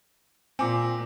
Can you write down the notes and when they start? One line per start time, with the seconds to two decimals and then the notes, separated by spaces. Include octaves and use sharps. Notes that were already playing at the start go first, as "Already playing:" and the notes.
0.59 A#2 C4 G#5 D6